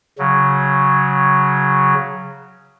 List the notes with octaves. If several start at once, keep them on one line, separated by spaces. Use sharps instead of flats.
C#3 F#3